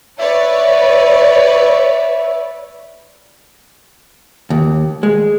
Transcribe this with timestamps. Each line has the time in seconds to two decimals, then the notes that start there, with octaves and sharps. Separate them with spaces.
0.19 B4 C#5 D5 E5
4.50 D#2
5.03 G#3